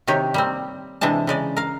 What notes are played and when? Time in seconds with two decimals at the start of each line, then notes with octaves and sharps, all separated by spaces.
0.07 C3 D#3 G4 C#5
0.34 G3 A#3 C4
1.01 C3 E3 G#3 D4 A5
1.27 C#3 G#3 D5
1.57 A#4 F5